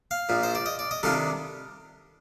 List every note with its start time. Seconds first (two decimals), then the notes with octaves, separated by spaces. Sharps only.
0.11 F5
0.29 A#1 A#2 F3
0.43 C5
0.55 D5
0.66 D#5
0.79 D5
0.91 D#5
1.03 C3 D#3 G3 D4 F4 A4